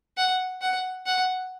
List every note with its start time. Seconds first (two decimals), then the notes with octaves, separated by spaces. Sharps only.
0.17 F#5
0.62 F#5
1.06 F#5